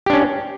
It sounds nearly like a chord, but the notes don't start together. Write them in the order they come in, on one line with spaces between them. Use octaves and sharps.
G4 D4 C#4